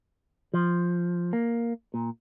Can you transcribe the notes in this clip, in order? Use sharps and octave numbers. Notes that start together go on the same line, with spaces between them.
F3
A#3
A#2